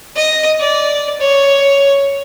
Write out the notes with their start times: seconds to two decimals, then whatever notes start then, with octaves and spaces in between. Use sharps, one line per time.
0.16 D#5
0.60 D5
1.20 C#5